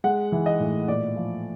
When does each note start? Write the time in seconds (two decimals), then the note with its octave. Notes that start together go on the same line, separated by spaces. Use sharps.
0.04 G#3 F#5
0.32 E3
0.46 D#5
0.60 A2
0.88 A#2 D5
1.16 F3